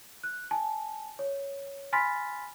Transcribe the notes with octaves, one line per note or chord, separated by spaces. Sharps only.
F#6
G#5 A5
C#5
G#5 B5 C6 F6 A6 B6